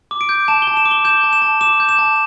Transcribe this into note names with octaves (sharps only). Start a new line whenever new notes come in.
D6
D7
G6
A5 E7
G7
A5
E7
D6
G7
G6 E7
A5
E7
A5
D6 E7
G6
E7
A5